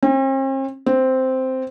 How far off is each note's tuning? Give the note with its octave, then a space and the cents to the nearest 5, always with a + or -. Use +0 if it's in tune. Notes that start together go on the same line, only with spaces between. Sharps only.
C4 +45
C4 -5